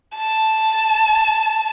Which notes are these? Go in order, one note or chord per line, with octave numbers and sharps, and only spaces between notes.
A5